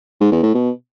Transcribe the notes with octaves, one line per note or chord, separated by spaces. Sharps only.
G#2
E2
A2
B2